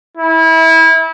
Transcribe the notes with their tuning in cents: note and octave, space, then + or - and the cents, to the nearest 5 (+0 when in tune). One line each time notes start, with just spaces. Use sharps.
E4 -25